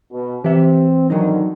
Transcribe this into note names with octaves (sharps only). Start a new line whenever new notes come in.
B2
E3 C4 G4 E5
G#2 D3 D#3 F#3 D#4